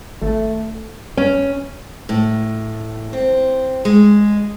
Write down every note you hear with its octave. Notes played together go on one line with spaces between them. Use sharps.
G#1 A3
C#4
A2
C4
G#3